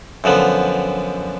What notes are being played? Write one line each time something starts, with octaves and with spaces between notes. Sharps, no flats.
F#2 D3 F3 B3